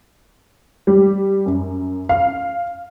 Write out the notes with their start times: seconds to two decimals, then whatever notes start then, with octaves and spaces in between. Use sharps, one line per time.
0.87 G3
1.46 F#2
2.09 F5